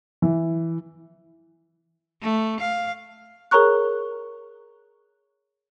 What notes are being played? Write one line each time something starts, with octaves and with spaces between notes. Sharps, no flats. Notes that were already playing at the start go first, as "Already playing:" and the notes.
E3
A3
F5
G#4 A#4 C#5 A#5 C#6 F#6